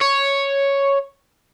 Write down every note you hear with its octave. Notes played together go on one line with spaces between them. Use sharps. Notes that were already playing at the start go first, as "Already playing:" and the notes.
C#5